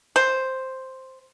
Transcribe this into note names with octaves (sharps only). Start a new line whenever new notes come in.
C5